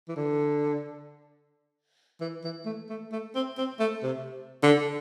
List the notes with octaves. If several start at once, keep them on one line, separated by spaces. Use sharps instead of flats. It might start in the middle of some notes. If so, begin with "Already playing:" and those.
E3
D3
E3
E3
A3
A3
A3
C4
C4
A3
C3
D3